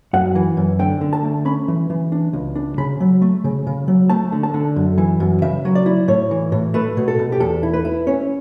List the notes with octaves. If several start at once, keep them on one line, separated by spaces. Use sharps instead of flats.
F#2 F#5
E3
F#2
D3 G5
D3
A5
A3
C#4 B5
E3
E3
D4
C#2
D4
C#3 B5
F#3
A3
C#3
C#3
F#3
A3 A5
D3
A5
D3
F#2
E3
F#2
C#3 E5
F#3
D5
E4
A2 C#5
E3
A2
A3 B4
B2
A4
B2
G4
E2 A4
E4
B4
E4
C#4 C#5